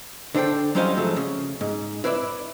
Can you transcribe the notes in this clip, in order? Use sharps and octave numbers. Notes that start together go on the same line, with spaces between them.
D3 D4 C5 D5 G5
F#3 G3 C#4 C5 D#5 F5
G#2 F3 F#3 A3
C#3
G#2
E4 B4 C5 D5 E5